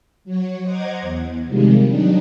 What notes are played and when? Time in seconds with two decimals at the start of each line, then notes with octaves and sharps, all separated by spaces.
0.25 F#3 C#5
0.62 C5 D#5 F#5 A#5 D6 G#6
1.01 E2
1.47 C3 D#3 F3 G3 G#3
1.86 F#3 G3 D4 D#4